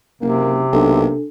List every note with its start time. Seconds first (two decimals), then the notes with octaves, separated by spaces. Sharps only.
0.21 F#1 C3 A#3
0.73 B1 A#3 D4 A4